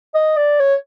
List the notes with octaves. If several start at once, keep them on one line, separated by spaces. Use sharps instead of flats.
D#5
D5
C#5